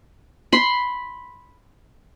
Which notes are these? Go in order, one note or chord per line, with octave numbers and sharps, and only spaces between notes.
B5 C6